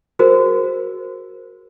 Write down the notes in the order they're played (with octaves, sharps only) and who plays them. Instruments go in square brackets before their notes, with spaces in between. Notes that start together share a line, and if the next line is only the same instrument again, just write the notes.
[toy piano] F#4 G#4 A#4 C5